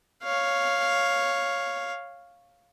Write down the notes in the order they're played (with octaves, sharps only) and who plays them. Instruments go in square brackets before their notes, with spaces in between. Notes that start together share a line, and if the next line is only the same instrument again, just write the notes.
[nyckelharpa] C#5 F5